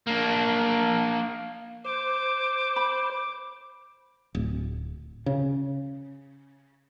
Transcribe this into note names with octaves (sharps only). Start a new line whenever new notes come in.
A#3 D4
C5 D6
B5
D1
C#3